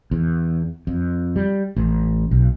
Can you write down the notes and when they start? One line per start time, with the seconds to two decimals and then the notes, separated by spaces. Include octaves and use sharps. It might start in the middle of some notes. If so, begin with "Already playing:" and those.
0.11 E2
0.87 F2
1.36 G3
1.76 A1
2.31 B1